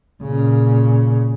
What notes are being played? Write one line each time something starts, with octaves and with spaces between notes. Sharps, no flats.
A#2 C#3